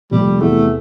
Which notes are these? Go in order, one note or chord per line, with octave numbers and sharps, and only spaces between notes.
F1 G3
E2 C3 A3